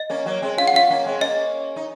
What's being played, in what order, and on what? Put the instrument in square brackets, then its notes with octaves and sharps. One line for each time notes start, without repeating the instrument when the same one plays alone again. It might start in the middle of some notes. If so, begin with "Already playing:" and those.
Already playing: [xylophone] D#5
[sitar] A#3 C#4
F#3 A#3
G#3 C4
[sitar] C#4 F4 [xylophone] F5
[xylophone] F#5
[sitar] C#4 F4 [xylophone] F5
[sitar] A#3 C#4
G#3 C4
[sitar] A#3 C#4 [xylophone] D#5
[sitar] D#4